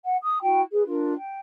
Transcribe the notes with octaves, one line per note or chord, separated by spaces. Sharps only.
F#5
D#6
E4 F#4 G5
G#4 B4
D4 F4 A#4
G5